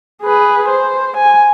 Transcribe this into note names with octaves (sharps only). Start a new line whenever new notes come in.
G#4 B4
C5
G#5